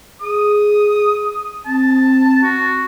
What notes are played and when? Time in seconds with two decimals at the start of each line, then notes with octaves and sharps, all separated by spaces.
0.21 G#4 D#6
1.66 C4 A5
2.43 F#4